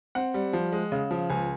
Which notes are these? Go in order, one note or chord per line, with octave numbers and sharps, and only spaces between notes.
C4 F#5
G3
F3
G#3
C#3
F3
C#2 G#5